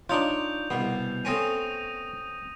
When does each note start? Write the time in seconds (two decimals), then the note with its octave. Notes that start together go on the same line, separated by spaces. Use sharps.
0.09 D4 D#4 F4 C#5 D5 G6 F7
0.70 C2 B2 B3
1.25 A3 C4 C#4 D#6 A#6 D#7